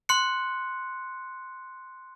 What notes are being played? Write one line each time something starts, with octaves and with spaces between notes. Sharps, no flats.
C6 F#6 C#7